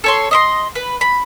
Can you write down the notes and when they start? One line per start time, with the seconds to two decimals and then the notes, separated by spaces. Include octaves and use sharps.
0.04 A4 C#5 C6
0.31 D#5 E5 C6
0.75 B4
1.01 B5